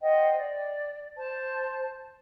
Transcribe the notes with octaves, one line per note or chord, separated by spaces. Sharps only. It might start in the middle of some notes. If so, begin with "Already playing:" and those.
C5 D#5 F#5 G5
D5
C5 A5